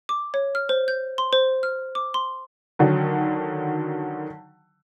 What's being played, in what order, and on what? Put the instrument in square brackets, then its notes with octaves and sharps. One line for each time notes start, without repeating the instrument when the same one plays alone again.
[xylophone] D6
C#5
F6
C5
G6
C6
C5
F6
D6
C6
[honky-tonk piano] D3 D#3 F#3